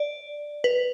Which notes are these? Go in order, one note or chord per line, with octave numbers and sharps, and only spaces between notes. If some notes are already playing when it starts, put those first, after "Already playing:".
Already playing: D5
B4